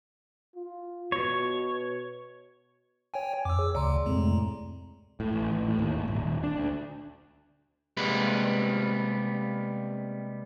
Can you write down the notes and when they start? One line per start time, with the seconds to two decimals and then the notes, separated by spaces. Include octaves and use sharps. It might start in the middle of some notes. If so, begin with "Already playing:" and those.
0.55 F4
1.12 B2 C#5
3.14 C#5 G5 G#5
3.45 F2 D6 E6
3.59 G#4 C#5
3.75 D2 C#3 D5 A#5 C6
4.06 F2 A2 C3 G#3
5.20 A2
5.33 A1
5.52 A1
5.68 A2
5.79 D#2
5.95 G#1
6.08 D#1
6.23 D#1
6.43 D4
6.57 D2
7.97 C3 G3 G#3 A#3 B3 B4